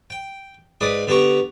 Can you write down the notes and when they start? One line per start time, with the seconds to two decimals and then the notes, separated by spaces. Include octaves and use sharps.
0.10 G5
0.81 G#2 B4 D5 D#6
1.07 D3 B3 G4 A#5 C#6